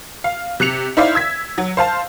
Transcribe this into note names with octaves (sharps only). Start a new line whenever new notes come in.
F5
C3 F#6 C#7 F7
D#4 E4 C5 D5 E5 F5
E6 G#6 B6
F#3
C5 F5 A5